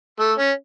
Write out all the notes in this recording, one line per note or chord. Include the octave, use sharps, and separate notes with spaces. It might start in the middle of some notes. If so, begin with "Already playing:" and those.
A3
C#4